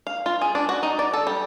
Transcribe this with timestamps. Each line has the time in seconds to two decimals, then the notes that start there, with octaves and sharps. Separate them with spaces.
0.07 F5
0.26 F4
0.41 G#4
0.55 D4
0.69 F#4
0.83 D#4
0.99 D5
1.14 A4
1.27 G3